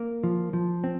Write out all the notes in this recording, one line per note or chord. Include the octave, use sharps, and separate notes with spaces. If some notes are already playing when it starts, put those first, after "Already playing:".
Already playing: A#3
F3
F3
C4